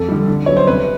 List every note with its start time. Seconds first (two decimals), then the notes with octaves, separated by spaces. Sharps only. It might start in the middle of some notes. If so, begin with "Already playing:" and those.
Already playing: F2 A4
0.08 D3 G3
0.28 D3
0.46 F#3 B3 C#5
0.57 C5
0.67 C3 B4